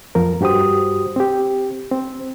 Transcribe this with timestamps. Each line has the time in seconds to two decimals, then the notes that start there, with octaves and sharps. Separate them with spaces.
0.15 F2 F3 A#4
0.41 G2 F#4 G4 C5 D#6
1.16 C4 G4
1.91 C4